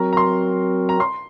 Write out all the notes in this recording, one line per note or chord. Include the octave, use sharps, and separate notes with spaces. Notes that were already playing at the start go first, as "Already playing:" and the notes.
Already playing: F#3 C4 F#4 A#4 A#5
A#5
C6
A#5
C6